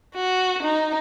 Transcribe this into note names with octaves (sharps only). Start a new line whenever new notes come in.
F#4
D#4